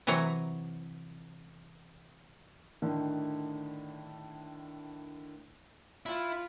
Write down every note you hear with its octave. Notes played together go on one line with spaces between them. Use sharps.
C3 E3 F#3 C#5 A#5
A2 D3 D#3
E4 F4